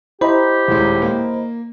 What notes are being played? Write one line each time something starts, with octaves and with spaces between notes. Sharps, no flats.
E4 G4 C5 D#5 A#5 B5
D#1 A2 G#3
A#3